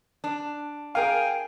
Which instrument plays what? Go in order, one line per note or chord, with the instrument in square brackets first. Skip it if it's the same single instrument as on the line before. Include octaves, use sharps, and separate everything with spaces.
[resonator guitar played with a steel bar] D4
[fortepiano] G#4 A#4 F5 [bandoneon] G5 G#5